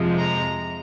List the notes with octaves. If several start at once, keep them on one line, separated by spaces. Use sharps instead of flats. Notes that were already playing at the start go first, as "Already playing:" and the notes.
Already playing: F2 C3 F3 G#3
A#5